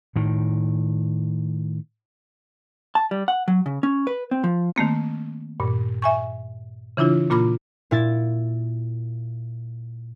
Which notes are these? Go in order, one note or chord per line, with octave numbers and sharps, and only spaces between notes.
A2 D#3
A5
G3
F#5
F#3
C#3
C#4
B4
C4
F3
D#3 A3 A#3 C4
G2 A#2
E5 G#5 C#6
C#3 E3 D4 E4 F4
A#2 A#3 F4 B5 D6
A#2 E4 A6